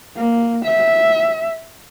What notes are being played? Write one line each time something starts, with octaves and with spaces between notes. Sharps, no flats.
A#3
E5